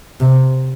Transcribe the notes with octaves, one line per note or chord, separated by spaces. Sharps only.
C3